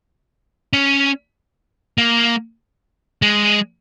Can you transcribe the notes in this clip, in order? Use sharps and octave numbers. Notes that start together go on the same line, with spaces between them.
C#4
A#3
G#3